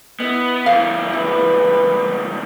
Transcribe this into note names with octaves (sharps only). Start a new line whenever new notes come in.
B3 E4 D#5
C#2 E3 F5
E4 B4